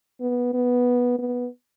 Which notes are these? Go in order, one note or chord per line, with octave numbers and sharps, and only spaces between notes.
B3
B3
B3